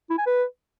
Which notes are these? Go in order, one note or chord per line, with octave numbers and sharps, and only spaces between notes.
E4
G#5
B4